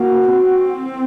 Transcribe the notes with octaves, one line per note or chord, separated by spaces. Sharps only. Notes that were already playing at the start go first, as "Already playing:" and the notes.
Already playing: A#3 F#4
C4